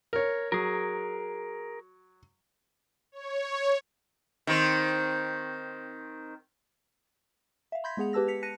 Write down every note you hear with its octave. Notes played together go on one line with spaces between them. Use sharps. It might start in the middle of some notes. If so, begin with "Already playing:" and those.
A#4 C#5
F#3 G#4 A#4
C#5
D#3 C4
E5 F5
B5 C6 G6 G#6 A#6 B6
G#3 B3 G#4 F#5 F7
G4 B4 A5 E6 A#6
B6 C#7 F7
A5 F#6 A#6 C#7 D#7